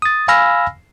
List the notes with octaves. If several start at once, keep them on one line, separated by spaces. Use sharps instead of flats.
D#6 A6
F5 G#5 B5 E6 F6 A#6